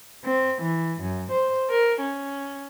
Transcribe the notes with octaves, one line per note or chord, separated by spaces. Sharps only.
C4
E3
F#2
C5
A#4
C#4